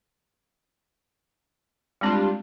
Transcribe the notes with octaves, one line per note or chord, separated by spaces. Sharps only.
G3 G#3 C4 D4 F4